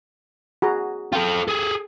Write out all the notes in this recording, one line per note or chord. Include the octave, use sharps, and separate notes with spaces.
F#4 G#4 A#5
F4 A4 G5
G#4 A4